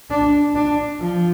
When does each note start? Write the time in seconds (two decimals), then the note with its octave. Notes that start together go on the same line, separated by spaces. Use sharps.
0.10 D4
0.55 D4
1.00 F3